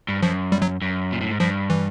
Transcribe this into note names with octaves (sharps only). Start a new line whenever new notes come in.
G2
F#2 F3
G3
F#3
F#2
A#2
A2
G#2
G2 F3
E3